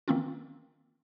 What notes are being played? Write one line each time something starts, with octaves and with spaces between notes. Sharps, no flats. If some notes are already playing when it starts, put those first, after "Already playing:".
D#3 E3 A#3 C4 C#4 F4